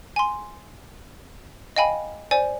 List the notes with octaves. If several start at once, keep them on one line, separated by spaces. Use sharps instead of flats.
G#5 C6
D#5 F5 G5 G#5 B5
C5 D5 G#5